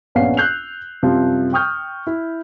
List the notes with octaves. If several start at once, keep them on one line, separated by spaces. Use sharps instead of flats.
A#1 B3 C#4 F5 F#5 C7
E6 F#6 G6 C7 F7
F#2 C3 F3 G3
G5 C#6 D#6 F6 G6
E4